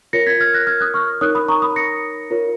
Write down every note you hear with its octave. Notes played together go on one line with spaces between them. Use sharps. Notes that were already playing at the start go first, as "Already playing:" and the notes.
F4 A#4 C#5 A#6 C#7
G#6 B6
F6 G#6
F#6 A#6
F6 G#6
D#6 F#6
C#6 F6
D#4 A#4 C#5 D#6 F#6
B5 D#6
A#5 C#6
B5 D#6
A#6 C#7
F4 A#4 C#5